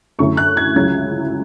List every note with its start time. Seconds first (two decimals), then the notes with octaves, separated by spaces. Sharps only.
0.19 F#2 D3 A3 C#4 E4 C#6
0.37 F#6
0.57 G#6
0.76 C#2 C#3 F#3 C#4 E4 G#6